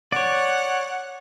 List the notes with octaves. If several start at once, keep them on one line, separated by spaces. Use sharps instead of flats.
C#5 D5 F#5